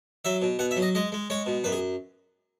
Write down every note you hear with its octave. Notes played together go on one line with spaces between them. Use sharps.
F#3 E5
B2
B2 F#5
E5
F#3
D#5
G#3 D#5
G#3
G#3 C#5
B2
F#2 B4
G#4